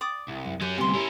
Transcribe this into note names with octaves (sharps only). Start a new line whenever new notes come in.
D5 D6 D#6
C2
F#2
F#3 C#4 G4
D2 C3 G3 B3 G4 G#5 C6
C#4 E4 G4 G#4 A#4